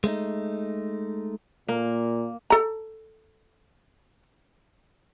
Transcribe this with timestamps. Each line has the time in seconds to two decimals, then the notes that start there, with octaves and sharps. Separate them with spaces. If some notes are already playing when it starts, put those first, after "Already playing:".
0.04 G#3 A3 C#4 D#4
1.69 A#2 A#3
2.50 A4 A#5